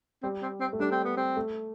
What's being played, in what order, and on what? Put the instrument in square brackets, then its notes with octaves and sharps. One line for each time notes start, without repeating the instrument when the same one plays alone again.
[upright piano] G3 [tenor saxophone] C4
[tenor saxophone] C4
C4
[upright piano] A3
[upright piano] G3 [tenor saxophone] D4
[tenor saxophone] C4
B3
C4
[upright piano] A3